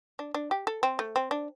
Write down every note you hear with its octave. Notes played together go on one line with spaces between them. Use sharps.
D4
D4
G4
A4
C4
A3
C4
D4